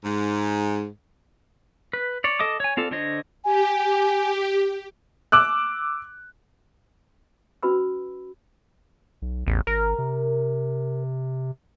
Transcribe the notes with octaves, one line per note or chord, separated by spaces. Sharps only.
G#2
B4
C#5 D5
A4 D#5 D6 D#6
C#5 G#5
C4 F4 A4 D5
D3 D4 C5 C#5 D#5
G4 G#5
D6 E6 F#6
C#4 F#4 B4 B5 E6
B1
A1 E2
G#1 A#4
C3